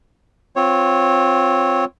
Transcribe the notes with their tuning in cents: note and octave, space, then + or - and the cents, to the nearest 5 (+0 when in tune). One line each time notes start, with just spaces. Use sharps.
C4 +0 F4 +15 C#5 -10